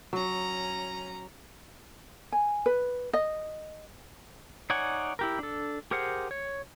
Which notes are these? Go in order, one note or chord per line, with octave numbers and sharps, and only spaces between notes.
F#3 C#4 A#5
G#5
B4
D#5
D#4 C#5 D5 F#5 G#5
E4 G4 A#4
D4 A4
G4 G#4 A#4 C5 F#5
C#5